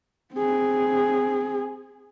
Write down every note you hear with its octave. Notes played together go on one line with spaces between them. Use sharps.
C4 G#4